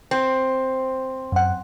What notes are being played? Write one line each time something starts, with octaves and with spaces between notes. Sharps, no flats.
C4
F#2 F#5